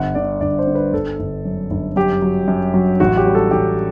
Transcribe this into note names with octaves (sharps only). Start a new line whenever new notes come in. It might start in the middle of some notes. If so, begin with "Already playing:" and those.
Already playing: G1 F#5
D3 D5
G1 D5
C5
D3
B4
G1 A4
G1
F#2
G1
F#2 G4
F#3
F#2
F#3
A1 F#4
G4
G3
A4
A1 G4